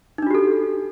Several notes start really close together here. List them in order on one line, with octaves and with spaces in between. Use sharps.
D#4 D4 F#4 G4 A4